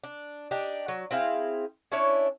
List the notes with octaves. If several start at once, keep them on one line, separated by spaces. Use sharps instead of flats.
D4
D4 D#4 G4
F#3
C4 E4 G#4 F5
C#4 D4 E4 C#5